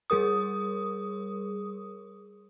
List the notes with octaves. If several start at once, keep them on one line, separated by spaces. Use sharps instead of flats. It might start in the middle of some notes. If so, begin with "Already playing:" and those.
G3 G#4 A#4 D#6